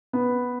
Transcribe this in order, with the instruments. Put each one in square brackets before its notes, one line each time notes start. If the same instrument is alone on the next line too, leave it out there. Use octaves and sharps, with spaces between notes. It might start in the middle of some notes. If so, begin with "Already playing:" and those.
[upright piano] B3